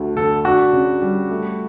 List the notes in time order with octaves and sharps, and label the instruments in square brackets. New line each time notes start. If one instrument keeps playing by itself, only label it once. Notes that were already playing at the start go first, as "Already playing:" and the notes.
Already playing: [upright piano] D2 A3
[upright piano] D3 [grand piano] A4
[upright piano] D4 [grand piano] F#4
[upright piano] C#3
G3
A3